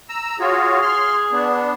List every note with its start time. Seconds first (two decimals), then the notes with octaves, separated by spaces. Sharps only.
0.09 A#5 E6
0.40 F4 F#4 G#4 C#5
0.82 C6 F6
1.32 B3 D4